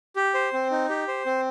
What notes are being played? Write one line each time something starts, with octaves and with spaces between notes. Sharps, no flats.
G4
C5
C4
D#4
G4
C5
C4